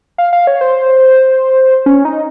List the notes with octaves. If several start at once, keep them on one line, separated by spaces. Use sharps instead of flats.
F5
F5
C#5
C5
C#4
D#4